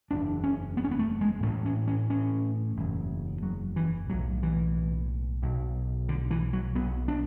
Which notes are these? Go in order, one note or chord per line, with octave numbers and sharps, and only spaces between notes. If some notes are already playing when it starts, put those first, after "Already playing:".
F#1 E2 C#3 D4
C#4
B3
C#4
B3
A3
G#3
A1 A2 A3
C#4
C#4
C#4
F#1 E2 C#3
F#3
E3
B1 A2 F#3
E3
B1 B2
D3
E3
F#3
B1 B2 B3
D4